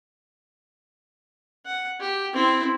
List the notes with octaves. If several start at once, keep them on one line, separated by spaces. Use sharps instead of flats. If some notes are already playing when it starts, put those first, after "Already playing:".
F#5
G4
C4 E4